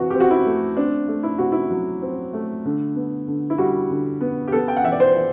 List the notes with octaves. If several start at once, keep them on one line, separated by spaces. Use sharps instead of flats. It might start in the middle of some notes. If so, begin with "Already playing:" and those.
Already playing: C3 E3 F#4
C4 G4
F#4
E4
A3
C4 D4
A3
E4
C3 F#4
E4
F#3
C4
A3
D3
B3
D3
E4
G3 F#4
D3
B3
G4
B3 A4
G5
F#5
E3 E5
D5
C5
E3